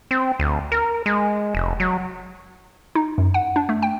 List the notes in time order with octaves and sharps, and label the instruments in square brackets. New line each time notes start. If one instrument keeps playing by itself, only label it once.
[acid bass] C4
D2
A#4
G#3
F1
F#3
[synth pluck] D#4
F#2
F#5
D4
A3
G5